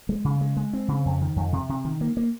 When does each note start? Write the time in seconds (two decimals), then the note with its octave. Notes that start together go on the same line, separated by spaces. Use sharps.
0.09 G#3
0.25 C#3
0.41 G#3
0.57 G#3
0.73 C4
0.88 C#3
1.05 F2
1.21 D#3
1.36 F2
1.53 C3
1.69 C3
1.85 D#3
2.01 A#3
2.17 A#3